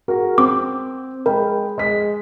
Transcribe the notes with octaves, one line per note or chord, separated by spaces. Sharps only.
F#4 G#4 A#4
C4 D6
G#3 A#4 G5 B5
G#3 B6